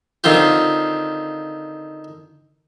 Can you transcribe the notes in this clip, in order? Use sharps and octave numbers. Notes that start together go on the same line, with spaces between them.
D3 D#3 C4 F4 G4